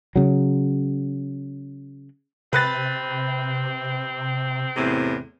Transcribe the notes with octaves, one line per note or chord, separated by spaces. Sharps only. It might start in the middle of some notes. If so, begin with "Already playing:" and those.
C#3 F#3
C3 C4 B4 F#6 A6
E2 A2 C3